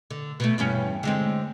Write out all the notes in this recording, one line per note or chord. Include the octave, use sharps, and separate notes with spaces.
D3
B2 A3
E2 G2 C#4
D3 G#3 C4